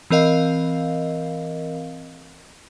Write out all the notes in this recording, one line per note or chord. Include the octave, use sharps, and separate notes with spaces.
E3 C4 A#4 D#5 F5